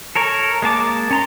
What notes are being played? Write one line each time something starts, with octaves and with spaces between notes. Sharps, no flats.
A4 A#4 C#5
G#3 A#3 A5 D6
C#4 A#5 C6